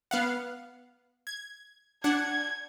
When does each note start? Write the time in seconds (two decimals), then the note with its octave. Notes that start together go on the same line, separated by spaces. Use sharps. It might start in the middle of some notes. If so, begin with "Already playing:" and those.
0.11 B3 F5 F#5
1.27 G#6
2.04 D4 F#5 G#6